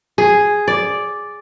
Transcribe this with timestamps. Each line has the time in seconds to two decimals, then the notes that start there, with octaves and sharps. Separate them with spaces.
0.18 G#4
0.68 D5